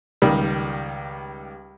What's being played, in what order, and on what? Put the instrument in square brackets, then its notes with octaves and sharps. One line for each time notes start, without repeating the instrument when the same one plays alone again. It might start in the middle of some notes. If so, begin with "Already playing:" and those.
[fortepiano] C#2 D#3 G3